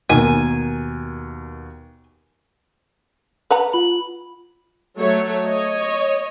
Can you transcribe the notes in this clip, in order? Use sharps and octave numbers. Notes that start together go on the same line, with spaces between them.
D#2 B2 A#3 G#5
B4 F#5 A#5
F4 B5 F#7
F#3 A3 C#5
C#5 D#5